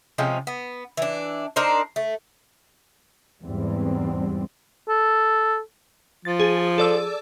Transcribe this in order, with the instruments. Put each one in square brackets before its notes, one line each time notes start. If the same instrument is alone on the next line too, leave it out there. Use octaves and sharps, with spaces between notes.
[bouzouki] C3 F3 G#3 C#4
B3
E3 D4
D4 D#4 A#4 C5
A3
[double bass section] E2 G#2 E3 G3 C4
[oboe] A4
[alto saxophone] F3 [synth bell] A6
[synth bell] G#4
A4 D5 E6